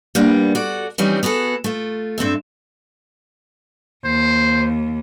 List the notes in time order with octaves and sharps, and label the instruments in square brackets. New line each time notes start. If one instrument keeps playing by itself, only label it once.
[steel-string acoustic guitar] G3 A#3 B3 D4
F#4 A4 D5
E3 F3 G3 C4 C#4 D#4
B3 F#4 G#4 A4
A3 F4
G2 C4 A4 E5
[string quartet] D#2 [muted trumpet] C5